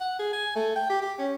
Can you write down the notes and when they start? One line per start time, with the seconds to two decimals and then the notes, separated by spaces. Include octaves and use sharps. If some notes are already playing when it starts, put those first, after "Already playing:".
0.01 F#5
0.19 G#4
0.33 G#5
0.55 A3
0.76 G5
0.89 G4
1.02 G4
1.19 C#4